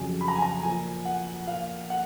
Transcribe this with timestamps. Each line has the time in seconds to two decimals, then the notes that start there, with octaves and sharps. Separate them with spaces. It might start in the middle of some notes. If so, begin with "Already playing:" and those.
Already playing: F2 C#3 F#3 G#5
0.21 B5
0.28 A#5
0.36 G#5
0.42 A#5
0.63 A#2 F3 G#5
1.05 F#5
1.47 A#2 F3 F5
1.90 F#5